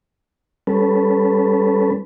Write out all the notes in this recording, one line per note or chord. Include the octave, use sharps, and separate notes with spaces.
G3 C#4 A4 B4